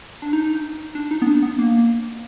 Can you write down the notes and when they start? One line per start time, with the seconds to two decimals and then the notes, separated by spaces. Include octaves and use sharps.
0.22 D4
0.33 D#4
0.95 D4
1.11 D#4
1.22 B3
1.27 D4
1.42 B3
1.59 A#3